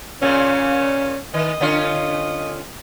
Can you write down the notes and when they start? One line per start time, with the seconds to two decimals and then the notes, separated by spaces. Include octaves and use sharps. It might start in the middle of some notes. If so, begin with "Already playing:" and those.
0.22 A#2 C#3 C#4
1.34 D#3 D#5
1.61 D3 C#4 F4